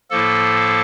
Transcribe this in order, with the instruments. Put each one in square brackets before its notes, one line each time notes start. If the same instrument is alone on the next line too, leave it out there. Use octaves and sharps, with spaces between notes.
[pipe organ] A2 F3 A#3 A4